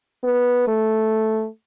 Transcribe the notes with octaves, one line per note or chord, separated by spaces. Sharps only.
B3
A3